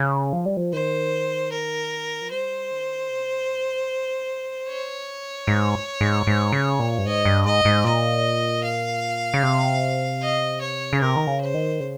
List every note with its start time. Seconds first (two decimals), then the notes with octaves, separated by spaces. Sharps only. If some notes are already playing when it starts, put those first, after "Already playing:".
Already playing: C#3
0.33 F3
0.46 G3
0.57 F3
0.73 D#3 C5
1.52 A#4
2.22 F3
2.31 G3 C5
2.71 D#3
3.10 C3
3.49 A#2
4.69 C#5
5.47 G#2
6.01 G#2
6.27 G#2
6.52 C#3
6.79 A#2
6.98 G2
7.05 G#2 D#5
7.25 G2
7.45 G#2 D#5
7.65 G#2
7.84 A#2 D#5
8.64 F5
9.34 C#3
9.43 C3
10.22 D#5
10.61 C#5
10.93 C#3
11.01 C3 A#4
11.16 D#3
11.27 C#3
11.41 C5
11.54 D#3
11.80 C#3